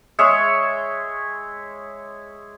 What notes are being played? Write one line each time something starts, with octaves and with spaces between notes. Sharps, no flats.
G#3 G#4 C#5 E5